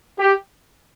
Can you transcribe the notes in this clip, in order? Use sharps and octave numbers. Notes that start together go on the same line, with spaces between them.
G4